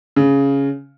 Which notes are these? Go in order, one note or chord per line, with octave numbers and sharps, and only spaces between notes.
C#3